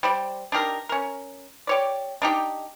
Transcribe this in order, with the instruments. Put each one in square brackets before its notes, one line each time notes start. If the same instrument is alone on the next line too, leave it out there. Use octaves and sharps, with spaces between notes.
[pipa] G3 C5 D5
D4 D#4 G4 A#4
C#4 A#4
G4 C#5 D5
D4 D#4 G4